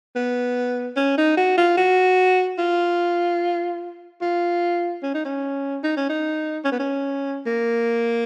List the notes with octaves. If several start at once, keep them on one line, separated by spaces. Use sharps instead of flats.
B3
C#4
D#4
F#4
F4
F#4
F4
F4
C#4
D#4
C#4
D#4
C#4
D#4
C#4
B3
C#4
A#3